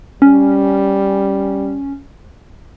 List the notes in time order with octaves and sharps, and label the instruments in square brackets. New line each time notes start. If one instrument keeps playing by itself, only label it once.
[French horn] G3 [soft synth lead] C#4